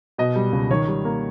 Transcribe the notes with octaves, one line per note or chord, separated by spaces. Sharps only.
B2 D#5
G3
C#2
D#3 C#5
G3
A#3